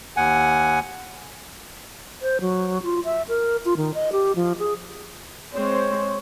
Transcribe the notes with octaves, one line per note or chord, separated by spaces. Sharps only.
D#2 F#5 G#5
C5
F#3
F4
E5
A#4
F4
D#3
D#5
G4
F3
G#4
G#3 C4 C5 C#5